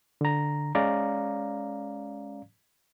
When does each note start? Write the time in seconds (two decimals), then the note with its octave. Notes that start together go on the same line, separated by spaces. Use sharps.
0.21 D3 A#5
0.75 G#3 C#4 D5 F5 A#5